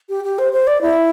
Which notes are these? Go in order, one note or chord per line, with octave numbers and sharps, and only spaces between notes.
G4
G4
C5
C5
D5
E4